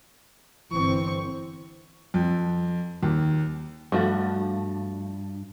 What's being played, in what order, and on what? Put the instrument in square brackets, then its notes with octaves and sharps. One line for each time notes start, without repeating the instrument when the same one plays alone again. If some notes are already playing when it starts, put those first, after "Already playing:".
[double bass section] G1 C4 [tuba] E3 [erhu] C#6
[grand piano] F2
D#2
[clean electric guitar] G2 [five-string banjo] F3 A3 F#4